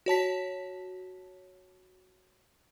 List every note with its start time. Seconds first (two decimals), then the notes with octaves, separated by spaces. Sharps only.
0.06 F#4 C#5 A5 B6